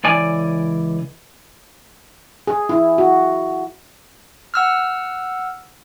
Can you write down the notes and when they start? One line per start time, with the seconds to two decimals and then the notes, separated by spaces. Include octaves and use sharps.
0.04 C#2 E3 D5 G#5
2.47 G#4
2.69 E4
2.98 F#4
4.54 F#5 E6 F6